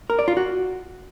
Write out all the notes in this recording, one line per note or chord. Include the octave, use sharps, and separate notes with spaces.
A#4
D5
F4
F#4